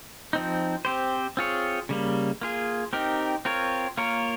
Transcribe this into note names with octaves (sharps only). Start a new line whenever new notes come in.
F3 C4 D#4
C4 G4 C5
C4 F4 G#4 C#5
C#3 G3 A#3
A#3 F4 G#4
C4 D#4 G4 A#4
C4 F4 A#4 C#5
A#3 F4 A#4 C#5